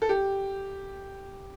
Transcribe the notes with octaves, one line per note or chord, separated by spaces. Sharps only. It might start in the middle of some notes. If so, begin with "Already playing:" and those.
A4
G4